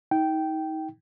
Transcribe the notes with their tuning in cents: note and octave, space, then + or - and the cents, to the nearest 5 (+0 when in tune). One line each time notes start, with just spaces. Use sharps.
D#4 +35 G5 -10